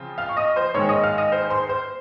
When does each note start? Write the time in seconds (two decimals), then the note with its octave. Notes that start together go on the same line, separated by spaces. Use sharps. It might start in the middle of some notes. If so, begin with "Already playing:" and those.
Already playing: C#3 F3 C4 F4
0.18 F5 F6
0.29 C#6
0.36 D#5 D#6
0.56 C5 C6
0.74 G#2 D#3 G#3 C#5 C#6
0.89 D#5 D#6
1.04 F5 F6
1.18 D#5 D#6
1.32 C5 C6
1.50 C5 C6
1.69 C5 C6